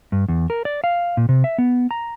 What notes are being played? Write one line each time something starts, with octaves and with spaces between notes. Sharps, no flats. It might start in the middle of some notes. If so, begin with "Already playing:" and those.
G2
E2
A#4
D5
F5
A#2
C3
E5
B3
A#5